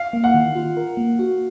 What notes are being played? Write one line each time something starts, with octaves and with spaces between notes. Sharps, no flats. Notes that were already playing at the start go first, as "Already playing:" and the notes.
Already playing: F5
A#3
F#5
D#3
F4
A#4
A#3
F#4